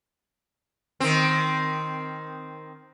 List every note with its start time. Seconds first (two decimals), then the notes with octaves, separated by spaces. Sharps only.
1.00 D#3 C4